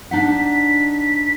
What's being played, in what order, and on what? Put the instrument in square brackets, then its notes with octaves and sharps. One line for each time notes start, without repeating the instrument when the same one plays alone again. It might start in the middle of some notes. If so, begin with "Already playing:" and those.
[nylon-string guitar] D4 D#4 F#5 [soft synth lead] B6